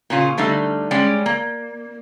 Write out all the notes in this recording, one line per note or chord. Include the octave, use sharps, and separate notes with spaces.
A#2 C#3 C#4 F4
D3 G3 A3 D#4
G3 G#3 C#4 G4 D5
A#3